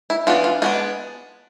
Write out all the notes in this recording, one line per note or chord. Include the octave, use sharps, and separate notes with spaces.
E4
E3 B3 D4 F4
F4
G#3 B3 D4 F4